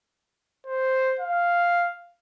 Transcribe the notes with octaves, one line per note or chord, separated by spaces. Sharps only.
C5
F5